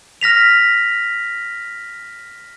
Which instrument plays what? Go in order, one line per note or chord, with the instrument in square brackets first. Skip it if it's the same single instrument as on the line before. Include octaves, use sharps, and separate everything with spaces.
[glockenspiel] F6 A#6 B6 F7